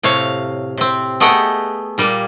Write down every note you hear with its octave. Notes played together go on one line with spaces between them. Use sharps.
A2 C3 C#5 F5
C3 C4
A3 B3 G#4 D#5 F#5 G5
A#2 G3 A#3